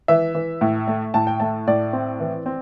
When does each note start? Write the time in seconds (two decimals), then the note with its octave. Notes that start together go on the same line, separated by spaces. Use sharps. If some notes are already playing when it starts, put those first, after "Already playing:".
0.08 E3 E5
0.35 E3
0.61 A2
0.88 A3
1.14 A2 A5
1.27 G5
1.40 A3 A5
1.67 A2 D5
1.93 C4
2.20 E3
2.46 C4